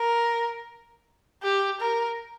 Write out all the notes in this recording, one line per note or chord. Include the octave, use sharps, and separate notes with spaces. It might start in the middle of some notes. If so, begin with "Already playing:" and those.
Already playing: A#4
G4
A#4